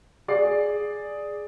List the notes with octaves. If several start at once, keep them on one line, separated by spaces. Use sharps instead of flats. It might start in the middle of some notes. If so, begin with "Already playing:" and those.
G#4 D5 C7